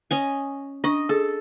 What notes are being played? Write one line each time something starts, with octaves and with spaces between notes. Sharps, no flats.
C#4 D#5 G#5
D4 D#5 C#6
G#4 A4